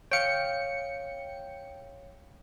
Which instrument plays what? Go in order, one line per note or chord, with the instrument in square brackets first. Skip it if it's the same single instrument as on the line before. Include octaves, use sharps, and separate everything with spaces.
[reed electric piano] C#5 F5 [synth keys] G5 C#7